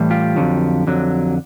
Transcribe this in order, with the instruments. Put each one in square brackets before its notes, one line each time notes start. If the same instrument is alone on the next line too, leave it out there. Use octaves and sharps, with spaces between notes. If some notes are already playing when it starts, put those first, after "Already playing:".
Already playing: [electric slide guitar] A2 E3 G3
F4 G4
F2 D3 F#3
F2 D3 F#3